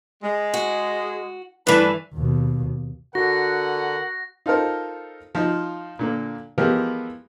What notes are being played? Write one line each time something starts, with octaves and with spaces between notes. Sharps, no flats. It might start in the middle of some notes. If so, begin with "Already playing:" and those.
G#3
F#4
G2 E3 A3 D4 B4
D#2 B2
D3 F#4 A#4 F#5 A#6
D#4 F4 A4 A#4 C5
F3 D#4 F4
A#2 D3 A#3
E3 F3 G#3 B3 G4 A#4